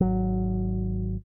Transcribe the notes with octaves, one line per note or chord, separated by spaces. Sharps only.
G#1 F#3